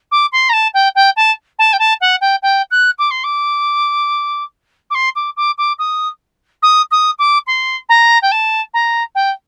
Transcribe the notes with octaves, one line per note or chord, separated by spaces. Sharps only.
D6
C6
A#5
A5
G5
G5
A5
A5
G5
A5
F#5
G5
G5
F#6
D6
C6
D6
D6
C6
D6
D6
D6
D#6
D#6
D#6
D6
C6
A#5
G5
A5
A#5
G5